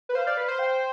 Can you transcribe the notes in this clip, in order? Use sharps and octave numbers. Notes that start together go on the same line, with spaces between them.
B4
C5 F5
D5
B4
C5
G5